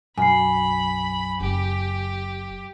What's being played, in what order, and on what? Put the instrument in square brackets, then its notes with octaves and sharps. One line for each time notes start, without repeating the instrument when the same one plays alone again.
[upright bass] B1 [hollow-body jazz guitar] F#2 [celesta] G#5 C7 [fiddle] B5
[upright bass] F#1 [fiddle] G4